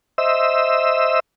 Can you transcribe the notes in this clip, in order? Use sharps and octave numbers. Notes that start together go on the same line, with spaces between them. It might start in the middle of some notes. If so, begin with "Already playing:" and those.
C5 D#5 E5 E6